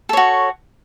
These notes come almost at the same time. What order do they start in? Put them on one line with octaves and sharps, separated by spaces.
A4 C#5 F#4